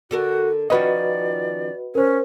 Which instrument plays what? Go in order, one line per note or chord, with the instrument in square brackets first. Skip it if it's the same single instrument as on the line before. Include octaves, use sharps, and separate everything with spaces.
[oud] D3 A4 A#4 [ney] F#4
[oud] D#3 F3 C#4 [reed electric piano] F#4 B4 D#5 [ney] D5
[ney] C#4 [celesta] A#4 C5